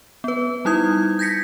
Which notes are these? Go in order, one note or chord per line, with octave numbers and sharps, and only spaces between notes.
B3 B4
G3 D#4 E4 D#6 G#6
G6 G#6 A#6 B6 C#7